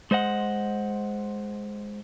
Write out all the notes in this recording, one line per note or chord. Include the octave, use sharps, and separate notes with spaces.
G#3 C5 D#5 F#5